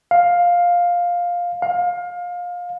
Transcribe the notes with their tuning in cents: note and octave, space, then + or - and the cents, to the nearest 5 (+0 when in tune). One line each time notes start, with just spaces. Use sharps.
F5 +10
F5 +25